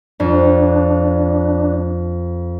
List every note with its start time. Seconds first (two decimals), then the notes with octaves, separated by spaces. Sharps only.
0.20 F2 D4